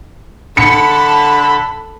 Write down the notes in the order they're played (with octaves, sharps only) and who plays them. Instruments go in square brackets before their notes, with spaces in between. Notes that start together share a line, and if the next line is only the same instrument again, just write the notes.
[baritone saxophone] D3 [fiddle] A4 A5 [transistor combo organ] B5 [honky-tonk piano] C#7